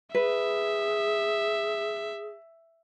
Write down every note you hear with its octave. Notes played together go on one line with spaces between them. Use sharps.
G#4 B4 E5